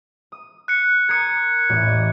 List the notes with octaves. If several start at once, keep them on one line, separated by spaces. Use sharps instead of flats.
D#6
F#6 C#7
A#4 C6 D#6 G#6 C#7
A1 E2 A2
D5 D#5